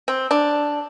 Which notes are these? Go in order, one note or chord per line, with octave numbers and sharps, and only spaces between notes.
C4
D4